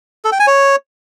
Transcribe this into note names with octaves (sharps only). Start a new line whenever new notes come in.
A4
G5
G#5
C#5